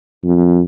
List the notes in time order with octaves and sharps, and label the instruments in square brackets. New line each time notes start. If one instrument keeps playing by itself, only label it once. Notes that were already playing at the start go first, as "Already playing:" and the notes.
[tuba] F2